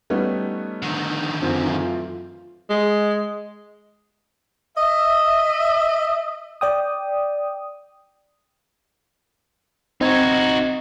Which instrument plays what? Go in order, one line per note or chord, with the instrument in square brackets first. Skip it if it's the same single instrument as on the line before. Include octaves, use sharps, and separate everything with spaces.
[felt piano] G3 B3 C#4 [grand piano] A3 D#4
[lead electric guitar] D3 D#3
[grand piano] F#2 [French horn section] E3 A3 F4 [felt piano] C4
[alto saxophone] G#3
[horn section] D#5 E5
[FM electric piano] D5 G5 D#6
[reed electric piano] C4 D#5 G#6 [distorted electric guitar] D#4 F#4